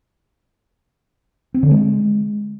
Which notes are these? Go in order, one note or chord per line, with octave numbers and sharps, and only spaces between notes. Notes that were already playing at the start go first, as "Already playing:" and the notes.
C4
D3
G#3